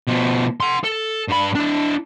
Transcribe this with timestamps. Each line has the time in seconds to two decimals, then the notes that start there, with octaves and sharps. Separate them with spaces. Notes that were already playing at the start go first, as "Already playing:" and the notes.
0.07 B2 F3
0.60 F#5 C6
0.84 A4
1.29 G2 B5
1.55 D4 E4